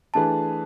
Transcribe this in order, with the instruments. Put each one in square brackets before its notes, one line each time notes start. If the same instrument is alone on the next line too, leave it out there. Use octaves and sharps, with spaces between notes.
[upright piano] E3 A3 D4 G#4 B4 [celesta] A5